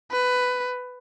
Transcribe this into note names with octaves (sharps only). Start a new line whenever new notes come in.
B4